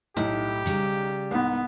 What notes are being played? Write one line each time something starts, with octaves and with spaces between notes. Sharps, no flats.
B1 A2 D#4 E4 G4
C#3 G3 A#5
C2 G#2 B3